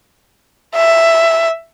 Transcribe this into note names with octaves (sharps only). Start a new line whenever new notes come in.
E5